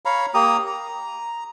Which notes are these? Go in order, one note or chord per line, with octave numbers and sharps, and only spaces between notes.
C#5 F5 A#5 B5
A#3 G4 A#5 D#6
A#5